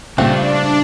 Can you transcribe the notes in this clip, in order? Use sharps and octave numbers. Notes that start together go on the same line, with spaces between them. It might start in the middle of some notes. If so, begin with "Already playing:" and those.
G2 A#2 C#3 A3 C4 D4 F4